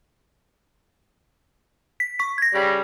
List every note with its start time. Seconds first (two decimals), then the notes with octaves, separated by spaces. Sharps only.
2.00 B6
2.19 C#6 B6
2.38 G#6 A#6
2.54 C#3 G3